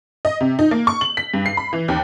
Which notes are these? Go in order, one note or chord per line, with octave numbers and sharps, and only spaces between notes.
D#5
C3
D#4
A#3
C#6
F#7
B6
G2
C7
B5
E3
D#2